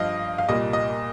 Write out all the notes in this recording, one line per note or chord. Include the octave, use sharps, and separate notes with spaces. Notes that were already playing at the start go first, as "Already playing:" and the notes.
Already playing: G2 F3 D#5 F5
F5
C2 A#2 G3 D#5
D#5